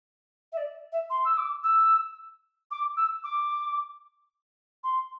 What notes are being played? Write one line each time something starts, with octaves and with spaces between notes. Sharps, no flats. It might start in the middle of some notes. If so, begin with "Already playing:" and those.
E5
D5
E5
C6
E6
D6
E6
D6
E6
D6
C6